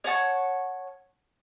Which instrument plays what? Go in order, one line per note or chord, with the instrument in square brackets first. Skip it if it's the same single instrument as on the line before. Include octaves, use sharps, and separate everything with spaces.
[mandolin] C#5 F#5 A5 C#6